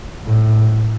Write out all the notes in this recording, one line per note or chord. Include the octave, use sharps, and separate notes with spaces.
A2